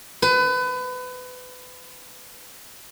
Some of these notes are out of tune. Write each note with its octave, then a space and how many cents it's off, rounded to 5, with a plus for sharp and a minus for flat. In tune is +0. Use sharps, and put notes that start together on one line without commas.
B4 +30